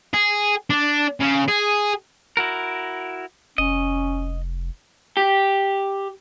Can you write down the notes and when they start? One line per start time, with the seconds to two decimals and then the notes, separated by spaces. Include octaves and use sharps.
0.14 G#4
0.70 D4
1.20 C#3
1.48 G#4
2.37 E4 F#4 A#4
3.58 F1 C#4 D#5
5.17 G4